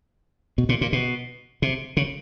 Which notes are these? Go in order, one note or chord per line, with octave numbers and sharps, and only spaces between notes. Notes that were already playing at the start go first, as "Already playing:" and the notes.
B2
A#2
A#2
B2
C3
C#3